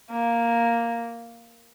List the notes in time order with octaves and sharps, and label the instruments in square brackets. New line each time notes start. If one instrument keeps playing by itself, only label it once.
[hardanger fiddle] A#3